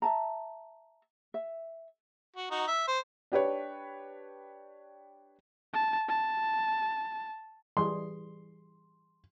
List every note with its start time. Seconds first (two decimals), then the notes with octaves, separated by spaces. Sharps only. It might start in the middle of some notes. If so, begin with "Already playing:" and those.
0.02 E5 A5 A#5
1.34 E5
2.36 F#4
2.51 D#4 F#4
2.68 E5
2.88 C5
3.32 D4 G4 B4 C#5
5.74 A5
6.09 A5
7.77 E3 G3 G#4 C6